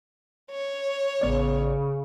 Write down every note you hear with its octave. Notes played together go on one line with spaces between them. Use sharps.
C#5
A1 C#3 B3 D5